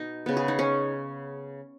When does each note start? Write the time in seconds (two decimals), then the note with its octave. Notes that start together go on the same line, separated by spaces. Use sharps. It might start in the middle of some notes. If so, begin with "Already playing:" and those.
Already playing: B2 D#4
0.26 C#3 B3
0.37 G#4
0.48 D#4
0.59 C#4